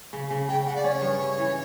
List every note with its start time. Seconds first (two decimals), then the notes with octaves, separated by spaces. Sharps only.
0.13 C#3
0.31 C#3
0.49 C#3 G5
0.66 C#3 F#5
0.75 D5
0.84 C#4 C#5
1.02 G2
1.19 C#4
1.38 E3